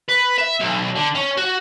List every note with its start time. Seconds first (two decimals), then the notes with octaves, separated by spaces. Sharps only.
0.09 B4
0.38 E5
0.60 B1
0.96 D3
1.15 C#4
1.37 F#4